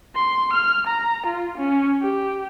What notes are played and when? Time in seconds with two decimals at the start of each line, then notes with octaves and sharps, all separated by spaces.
0.16 C6
0.53 F6
0.86 A#5
1.26 F4
1.57 C#4
2.02 G4